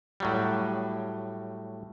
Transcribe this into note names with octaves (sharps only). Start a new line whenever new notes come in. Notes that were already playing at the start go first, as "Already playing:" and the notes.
A2 F#3 G3